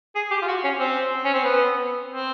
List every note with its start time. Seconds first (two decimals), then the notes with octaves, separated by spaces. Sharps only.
0.15 G#4
0.31 G4
0.42 F4
0.47 F#4
0.64 C#4
0.79 C4
1.25 C#4
1.34 C4
1.44 B3
2.08 C4